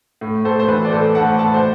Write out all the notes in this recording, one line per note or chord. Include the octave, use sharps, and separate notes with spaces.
A2
A2 A4 C5
C5
E3 B4
D5
A2 A4 C5
A2 F#5 A5
A2 F#5 A5
C5